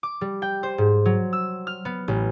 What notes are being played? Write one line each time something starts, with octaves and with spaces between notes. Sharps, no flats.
D6
G3
G5
C5
G#2
F#3
E6
F6
B3
A1